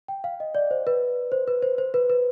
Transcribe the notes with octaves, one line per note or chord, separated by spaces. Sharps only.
G5
F5
D#5
D5
C5
B4
C5
B4
C5
C5
B4
B4